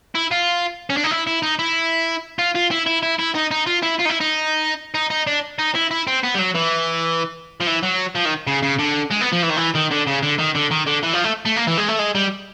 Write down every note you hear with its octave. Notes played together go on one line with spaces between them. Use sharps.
E4
F4
C#4
D4
D#4
E4
E4
D#4
E4
F4
F4
E4
E4
E4
E4
D#4
D#4
F4
E4
F4
D#4
E4
D#4
D#4
D#4
D4
D#4
E4
E4
C4
B3
G3
F#3
E3
F3
E3
F#3
F3
D#3
C#3
C#3
D3
G#3
B3
F3
E3
D#3
E3
D#3
D3
C#3
D3
D#3
D3
D#3
D3
E3
F3
A3
A3
A#3
E3
G#3
A3
G#3
G3